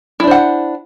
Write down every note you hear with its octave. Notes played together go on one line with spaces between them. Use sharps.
D4 E4 C5 F#5